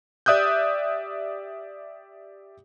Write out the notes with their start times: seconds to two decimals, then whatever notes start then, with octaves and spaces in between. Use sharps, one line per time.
0.26 G4 D5 E5 D#6 F#6 G6